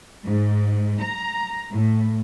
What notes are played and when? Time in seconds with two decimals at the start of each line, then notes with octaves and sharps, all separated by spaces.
0.24 G#2
1.00 A#5
1.72 A2